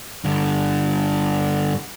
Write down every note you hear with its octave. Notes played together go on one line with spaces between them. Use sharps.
G2 D3